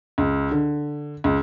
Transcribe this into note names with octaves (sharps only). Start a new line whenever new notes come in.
C#2
D3
C#2